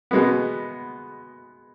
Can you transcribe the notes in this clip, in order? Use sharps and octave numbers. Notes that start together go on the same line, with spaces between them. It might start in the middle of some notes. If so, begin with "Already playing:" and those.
B2 G#3 B3